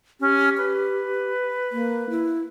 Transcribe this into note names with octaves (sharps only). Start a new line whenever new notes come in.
C#4 G4
B4
A#3
E4